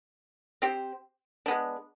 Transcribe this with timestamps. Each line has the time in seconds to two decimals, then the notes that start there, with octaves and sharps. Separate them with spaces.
0.62 C4 G4 C5
1.46 G#3 B3 D4